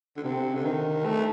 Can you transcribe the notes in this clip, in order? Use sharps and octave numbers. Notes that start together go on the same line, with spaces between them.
D3
C3
D3
D#3
A3